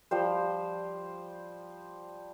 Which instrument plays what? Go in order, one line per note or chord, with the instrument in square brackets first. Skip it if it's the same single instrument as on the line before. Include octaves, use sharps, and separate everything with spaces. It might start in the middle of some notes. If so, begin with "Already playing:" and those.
[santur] F3 G3 C5